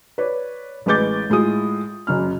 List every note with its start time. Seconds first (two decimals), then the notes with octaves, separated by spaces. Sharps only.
0.18 B4 C#5 D5
0.86 A1 G#3 B4 D6 G6 A6
1.30 A2 G#3 F4 D#6
2.07 F#1 F#2 F6